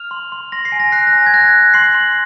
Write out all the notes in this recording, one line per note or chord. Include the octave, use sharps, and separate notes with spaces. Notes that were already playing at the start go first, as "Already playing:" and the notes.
Already playing: F6 F7
C6
C6
C6 A#6
C7
G#5
A#6
F#6 C7
A#6
G#5
G#6
F#6 A#6
F#6
C6 C7
C6